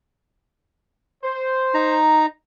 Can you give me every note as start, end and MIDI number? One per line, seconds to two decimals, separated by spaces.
1.23 1.98 72
1.74 2.26 63
1.74 2.26 82